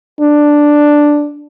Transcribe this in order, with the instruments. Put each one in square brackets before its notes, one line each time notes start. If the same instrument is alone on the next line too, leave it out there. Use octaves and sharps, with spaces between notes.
[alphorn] D4